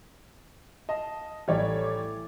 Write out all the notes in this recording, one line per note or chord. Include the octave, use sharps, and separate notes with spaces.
D#5 F5 A5
A1 A2 E3 G3 C#5 D5
D6 G#6 A6